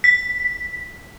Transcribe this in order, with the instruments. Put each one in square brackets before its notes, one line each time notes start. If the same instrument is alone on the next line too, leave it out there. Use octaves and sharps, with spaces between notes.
[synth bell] B6